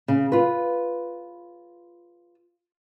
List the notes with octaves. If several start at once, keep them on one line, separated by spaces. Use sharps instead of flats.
C#3
F4 B4